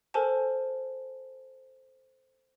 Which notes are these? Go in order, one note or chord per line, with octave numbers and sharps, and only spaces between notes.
A4 A#4 C5 G#5 A5